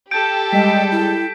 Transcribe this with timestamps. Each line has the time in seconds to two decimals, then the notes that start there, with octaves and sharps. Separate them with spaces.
0.11 G4 A4 G6 D7
0.52 G3 G#3 D#5 G5 B6
0.91 E4